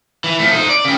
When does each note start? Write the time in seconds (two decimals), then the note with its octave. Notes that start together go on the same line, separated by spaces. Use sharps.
0.24 E3
0.39 F3 A3
0.51 D#4 C5
0.69 D5
0.85 C#3 G3